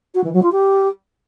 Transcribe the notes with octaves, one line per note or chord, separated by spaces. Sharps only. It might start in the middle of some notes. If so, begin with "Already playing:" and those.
F#4
E3
F#3
F4
G4